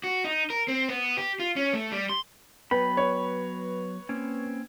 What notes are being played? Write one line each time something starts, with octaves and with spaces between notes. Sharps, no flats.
F#4
D#4
A#4
C4
B3
G4
F4
C#4
A3
G3
C6
F#3 B3 B4 G5 B5
C#5
A#3 C4 C#4